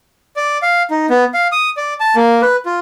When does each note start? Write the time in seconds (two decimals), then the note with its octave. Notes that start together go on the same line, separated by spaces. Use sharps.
0.36 D5
0.63 F5
0.91 D#4
1.10 B3
1.34 F5
1.52 D#6
1.77 D5
2.00 A5
2.16 A#3
2.42 B4
2.66 F4